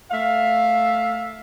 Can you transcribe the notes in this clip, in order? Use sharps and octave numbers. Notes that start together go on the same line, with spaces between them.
A3 E5 F5